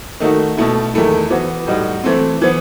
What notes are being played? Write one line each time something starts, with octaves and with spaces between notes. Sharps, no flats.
D#3 A3 D#4 F#4
B2 A3 E4
E2 D#3 A3 E4
E3 B3 F#4
A2 G3 D#4 F#4
E3 A3 C4
E3 B3